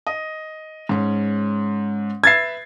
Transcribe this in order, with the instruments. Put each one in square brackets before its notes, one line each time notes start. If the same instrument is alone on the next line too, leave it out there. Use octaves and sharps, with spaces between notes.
[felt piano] D#5
G#2 C#4
[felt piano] B4 E5 [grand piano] G#6 A6 C7